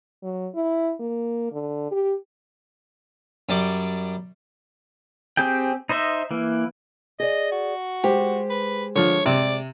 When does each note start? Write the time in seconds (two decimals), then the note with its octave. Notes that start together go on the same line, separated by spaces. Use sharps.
0.23 F#3
0.55 E4
1.00 A#3
1.52 D3
1.91 G4
3.49 F#2 G3 D5
5.37 C4 G4 G#4 G5
5.89 D#4 C5 D#5 E5
6.31 E3 A#3
7.20 G#4 D5 D#5
7.52 F#4
8.04 G#3 G4 C5
8.50 B4
8.95 D3 F3 C#5
9.26 C3 D5